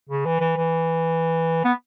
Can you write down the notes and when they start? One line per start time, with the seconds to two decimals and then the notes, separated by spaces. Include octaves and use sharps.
0.09 C#3
0.25 E3
0.40 E3
0.56 E3
1.64 B3